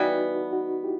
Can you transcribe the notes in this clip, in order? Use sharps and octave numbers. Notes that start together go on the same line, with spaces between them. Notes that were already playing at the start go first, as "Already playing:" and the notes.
Already playing: E3 G3 B3 D#4 F#4
D#4 F#4
E4 G4